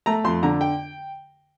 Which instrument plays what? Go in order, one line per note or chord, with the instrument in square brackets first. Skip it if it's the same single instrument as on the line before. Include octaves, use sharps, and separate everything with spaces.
[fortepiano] A3 A#5
F2 C6
D3 A#5
G5